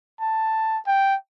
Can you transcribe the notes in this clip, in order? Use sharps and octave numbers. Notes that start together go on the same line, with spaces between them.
A5
G5